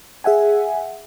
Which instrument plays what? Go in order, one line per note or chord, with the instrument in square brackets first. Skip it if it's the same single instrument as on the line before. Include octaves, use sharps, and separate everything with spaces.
[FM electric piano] G#4 E5 F#5 G#5